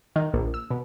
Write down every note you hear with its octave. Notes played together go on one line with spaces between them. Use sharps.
D#3
A#1
E6
B2